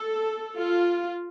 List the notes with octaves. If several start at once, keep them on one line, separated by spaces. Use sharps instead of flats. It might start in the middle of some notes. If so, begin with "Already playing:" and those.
Already playing: A4
F4